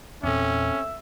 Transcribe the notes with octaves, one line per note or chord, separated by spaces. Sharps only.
E2 A#2 C4 C#4 A4 E5